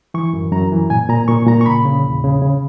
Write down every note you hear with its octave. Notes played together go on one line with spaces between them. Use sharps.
E3 C#6
F#2
F#2 A#5
E3
A#2 G#5
A#2 A#5
A#2 C#6
A#2 A#5
C#6
C#3 B5
C#3
E2
C#3
C#3